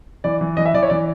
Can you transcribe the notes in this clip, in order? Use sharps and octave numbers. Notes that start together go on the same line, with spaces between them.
E3 D5
E3
E3 D#5
E5
E3 D5
C#5
E3 D5